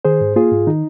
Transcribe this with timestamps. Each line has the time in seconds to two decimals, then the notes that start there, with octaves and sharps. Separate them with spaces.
0.05 D#3 G#4 C5
0.21 G#2
0.36 A#3 F4 G#4
0.52 G#2
0.67 D#3 D#4